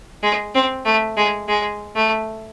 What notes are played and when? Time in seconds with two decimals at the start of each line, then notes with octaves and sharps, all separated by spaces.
0.23 G#3
0.55 C4
0.85 A3
1.17 G#3
1.49 G#3
1.95 A3